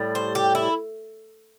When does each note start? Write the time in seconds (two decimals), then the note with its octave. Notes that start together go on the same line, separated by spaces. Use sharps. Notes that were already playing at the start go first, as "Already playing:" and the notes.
Already playing: A2 G3
0.15 C5
0.35 G4
0.55 E4